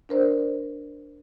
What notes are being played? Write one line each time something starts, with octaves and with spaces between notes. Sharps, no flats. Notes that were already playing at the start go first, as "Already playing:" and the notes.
D4 A#4 C5 D5